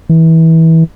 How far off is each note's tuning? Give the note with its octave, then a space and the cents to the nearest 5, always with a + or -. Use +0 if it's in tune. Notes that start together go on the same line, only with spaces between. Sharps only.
E3 -25